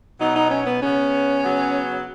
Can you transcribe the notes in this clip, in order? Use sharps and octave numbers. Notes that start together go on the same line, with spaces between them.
B2 F#3 B3 D#4
D#4
C#4
B3
C#3 B3 C#4
C#3 F#3 B3